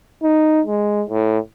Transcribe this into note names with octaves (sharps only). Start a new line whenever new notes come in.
D#4
G#3
A2